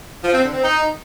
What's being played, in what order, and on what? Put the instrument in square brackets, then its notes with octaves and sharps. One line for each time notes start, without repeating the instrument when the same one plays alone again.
[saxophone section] F3
C4
D3
C4
D#4